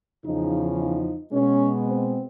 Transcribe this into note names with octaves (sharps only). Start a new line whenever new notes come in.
E2 C#3 F3 D#4
D#4
B2 G#3 B3 C#4
C4